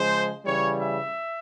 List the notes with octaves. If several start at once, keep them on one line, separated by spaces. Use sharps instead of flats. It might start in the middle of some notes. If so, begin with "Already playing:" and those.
Already playing: C#3 F3 G#3 C5
C#3 E3 G3 C#5
E5